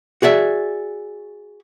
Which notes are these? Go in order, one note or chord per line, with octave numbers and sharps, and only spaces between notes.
F#4 G#4 D5 E5